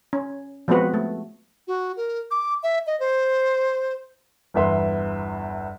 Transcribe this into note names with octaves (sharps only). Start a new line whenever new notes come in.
C#4
F3 G#3 B3 C4 F#4 B4
A3
F#4
A#4
D6
E5
D#5
C5
G1 E2 B4 E5 C6